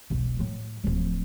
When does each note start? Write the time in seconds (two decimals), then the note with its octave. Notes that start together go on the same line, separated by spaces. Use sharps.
0.10 E1 B1
0.39 A2 F#3
0.84 D1 F3